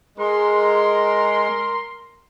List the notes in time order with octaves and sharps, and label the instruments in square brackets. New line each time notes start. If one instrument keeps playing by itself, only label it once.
[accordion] G#3 [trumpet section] A#4 C6